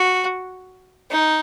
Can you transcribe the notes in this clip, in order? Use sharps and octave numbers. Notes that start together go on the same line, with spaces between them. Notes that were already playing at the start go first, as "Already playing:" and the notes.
Already playing: F#4
D#4